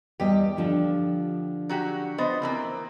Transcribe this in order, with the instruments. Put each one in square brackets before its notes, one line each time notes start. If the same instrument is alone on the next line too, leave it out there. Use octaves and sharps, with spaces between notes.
[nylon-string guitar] E2 G3 D#5 [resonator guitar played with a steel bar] G4
[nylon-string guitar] D3 F3 D4
[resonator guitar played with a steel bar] F#3 F#4 G4
B3 C5 D#5
E3 A#3 C4